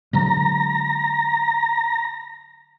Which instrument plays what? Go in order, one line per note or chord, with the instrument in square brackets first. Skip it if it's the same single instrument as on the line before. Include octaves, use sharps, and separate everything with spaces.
[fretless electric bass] D3 F#3 G#3 [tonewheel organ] A#5